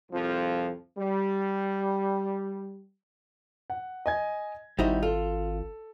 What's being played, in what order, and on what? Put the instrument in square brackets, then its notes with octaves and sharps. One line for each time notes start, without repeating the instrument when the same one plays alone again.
[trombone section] C2 F2 F3
G3
[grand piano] F#5
D#5 G#5 G#6
[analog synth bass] G#1 [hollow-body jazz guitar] G3 D#4 F#4 [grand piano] E4 C5 E5
[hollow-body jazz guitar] F4 [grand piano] A4